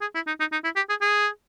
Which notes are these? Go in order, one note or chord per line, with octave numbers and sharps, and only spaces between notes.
G#4
E4
D#4
D#4
D#4
E4
G4
G#4
G#4